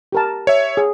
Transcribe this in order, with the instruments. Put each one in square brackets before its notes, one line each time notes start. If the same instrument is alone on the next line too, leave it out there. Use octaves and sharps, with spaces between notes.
[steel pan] G4 A#4 A5
[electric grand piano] C#5 E5
[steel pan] G#4